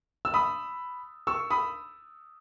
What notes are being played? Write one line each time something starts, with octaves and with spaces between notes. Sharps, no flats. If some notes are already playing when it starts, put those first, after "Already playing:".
E6
B5 D#6
C#6 E6
B5 D#6